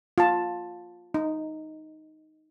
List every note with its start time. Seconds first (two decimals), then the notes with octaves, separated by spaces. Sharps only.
0.18 F4 A5
1.14 D#4